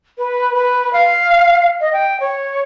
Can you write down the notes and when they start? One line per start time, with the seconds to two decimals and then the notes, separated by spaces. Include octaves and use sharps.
0.18 B4
0.55 B4
0.93 F5
1.81 D#5
1.93 G5
2.20 C#5